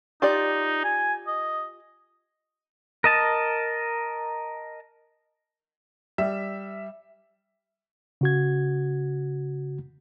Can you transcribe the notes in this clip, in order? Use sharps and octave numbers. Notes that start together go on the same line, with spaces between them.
D#4 F4 G4 D5
G#5
D#5
A#4 D#5 A5
G3 E5
C#3 F#4 G#6